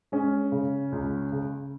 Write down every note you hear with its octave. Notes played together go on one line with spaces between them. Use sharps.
G#3 C#4
C#3
C#2
C#3